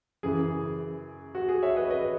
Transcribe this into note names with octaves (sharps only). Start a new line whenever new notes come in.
F#2 C#3 E3 G#4
F#4
G#4
C#5 E5
B4 D#5
B4 D#5